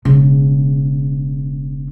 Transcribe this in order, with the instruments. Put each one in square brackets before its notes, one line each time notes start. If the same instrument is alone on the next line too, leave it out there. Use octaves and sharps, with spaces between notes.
[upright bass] E1 C#3